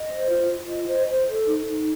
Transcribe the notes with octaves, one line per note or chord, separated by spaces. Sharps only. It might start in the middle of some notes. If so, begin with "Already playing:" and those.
Already playing: D#5
C5
F4
F4
D#5
C5
C5
A4
D#4
D#4